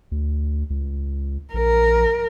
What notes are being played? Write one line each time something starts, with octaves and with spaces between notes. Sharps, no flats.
D2
C#2
A#1 A#4